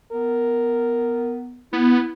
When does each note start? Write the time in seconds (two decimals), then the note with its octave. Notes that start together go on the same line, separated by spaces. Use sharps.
0.12 B3 A#4
1.73 B3 E4